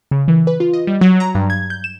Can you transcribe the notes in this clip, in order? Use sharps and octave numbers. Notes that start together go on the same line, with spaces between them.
C#3
E3
B4
F4
D#5
G3
F#3
A#5
G2
G#6
G6
E7